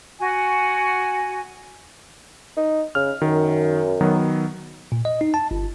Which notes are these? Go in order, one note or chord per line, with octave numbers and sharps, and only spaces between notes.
F#4 G#5
D#4
C#3 F6
F#2 D#3
D#3 F#3 B3
A#2
D#5
D#4
A5
G1